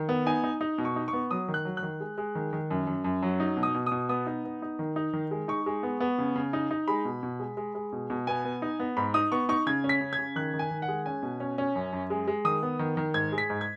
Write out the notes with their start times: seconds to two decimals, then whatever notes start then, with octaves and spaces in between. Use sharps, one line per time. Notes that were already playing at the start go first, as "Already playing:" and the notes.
Already playing: D#3
0.09 B3
0.26 D#4 G#5
0.44 D#4
0.61 D#4
0.78 B2
0.85 C#6
0.96 D#4
1.08 C#6
1.13 B3
1.31 F#3 D#6
1.48 D#3
1.54 F#6
1.65 F#3
1.77 F#6
1.83 D#3
2.00 G#3
2.18 G#3
2.35 D#3
2.53 D#3
2.71 F#2
2.87 F#2
3.04 F#2
3.22 F#3
3.40 D#4
3.57 B2
3.63 D#6
3.75 B2
3.86 D#6
3.92 B2
4.09 B3 D#6
4.27 D#4
4.45 B3
4.62 D#4
4.79 D#3
4.96 D#4
5.13 D#3
5.31 G#3
5.48 D#4 C#6
5.66 G#3
5.83 B3
6.00 B3
6.18 C#3
6.36 C#3
6.53 D#4
6.71 D#4
6.88 G#3 B5
7.05 B2
7.23 B2
7.40 G#3
7.57 G#3
7.75 G#3
7.92 B2
8.10 B2
8.27 B3 G#5
8.45 B3
8.62 D#4
8.80 B3
8.97 G#2 B5
9.14 D#4 D#6
9.32 B3 C#6
9.49 D#4 C#6
9.66 C#3 G#6
9.84 C#4
9.89 B6
10.01 C#3
10.13 G#6
10.19 C#3
10.36 D#3 F#6
10.54 D#3
10.59 G#5
10.71 D#3
10.82 F#5
10.88 G#3
11.06 C#4 G#5
11.23 B2
11.40 C#4
11.58 C#4
11.75 F#2
11.93 F#2
12.10 G#3
12.28 G#3
12.45 D#3 D#6
12.63 B3
12.79 D#3
12.97 D#3
13.14 G#2 G#6
13.32 G#3
13.38 B6
13.50 G#2
13.61 G#6